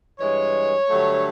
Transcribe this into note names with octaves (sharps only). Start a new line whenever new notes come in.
G2 E3 G#3 C#5
G2 D3 F#3 A3